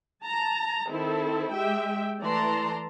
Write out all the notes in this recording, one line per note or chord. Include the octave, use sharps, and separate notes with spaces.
A5 A#5
D#3 C4 E4 A4
G#3 G4 E5 G5
E3 A3 D5 A5 A#5 C6